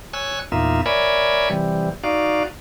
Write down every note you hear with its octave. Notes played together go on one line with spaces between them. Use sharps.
C#5 G#5 E6 F#6
E2 A#2 A#3 D#4 F4 E5
A#4 C#5 D5 E5 G#5 B5
C3 E3 G3
D#4 F#4 D5 F5